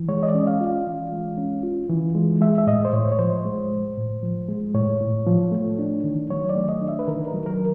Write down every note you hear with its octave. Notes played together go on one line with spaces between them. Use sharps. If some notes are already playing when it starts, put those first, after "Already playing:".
Already playing: E3
G#3 C#5
D#5
D5
C#4
F5
F4
F5
E3
G#3
C#4
F4
E3
G#3
G#3 E5
E5
A2 D#5
C5
A2 C#5
C#5
F3 C5
G#3
A2
A2
F3
G#3
A2 C#5
A2
F3
A3
D4
D#3
F#3 C#5
D5
A3
D#5
D4
E5
B4
D#3 A#4
A#4
F#3
A#4